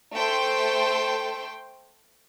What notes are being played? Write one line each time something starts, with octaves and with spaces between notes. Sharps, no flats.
A3 A4 C5 G5 C6